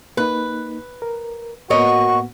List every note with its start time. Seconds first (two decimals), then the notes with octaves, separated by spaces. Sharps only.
0.17 A#3 D#4 B4
1.02 A#4
1.70 A2 A#3 B3 F#4 A#4 C#5 D#5 C#6